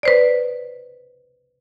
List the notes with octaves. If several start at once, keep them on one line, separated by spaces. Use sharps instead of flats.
B4 C5 D5